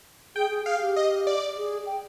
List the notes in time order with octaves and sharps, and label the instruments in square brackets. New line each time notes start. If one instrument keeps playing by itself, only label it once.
[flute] G#4 [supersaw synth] G5
[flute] G#4
[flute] G#4 [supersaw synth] F5
[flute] G4
[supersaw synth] D#5
D5
[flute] G#4
G5